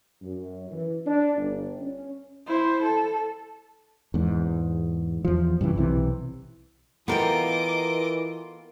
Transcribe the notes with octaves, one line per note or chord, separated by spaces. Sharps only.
F#2
E3
D4
G1
C#4
E4 C5
A4
E2 G#2
E2 F3
G2 C#3 E3
B1 C3 E3
E3 B3 F4 A4 A#4 D#5 G5 D6